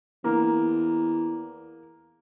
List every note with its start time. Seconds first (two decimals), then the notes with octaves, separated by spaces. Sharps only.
0.24 E2 A#3